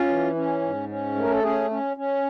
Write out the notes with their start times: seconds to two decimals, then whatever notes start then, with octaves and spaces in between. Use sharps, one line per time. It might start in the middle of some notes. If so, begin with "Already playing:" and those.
Already playing: C#4 F4
0.08 E3
0.35 C#4
0.61 G#2
0.89 C#4
1.15 A3 A#4
1.31 A4
1.42 C#4 G#4
1.70 C#4
1.97 C#4